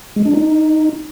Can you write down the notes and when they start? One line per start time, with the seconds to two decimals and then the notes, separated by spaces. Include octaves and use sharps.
0.16 G#3
0.25 D4
0.35 D#4